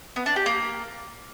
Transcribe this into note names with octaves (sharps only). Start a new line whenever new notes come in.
B3
D4
G4
A#3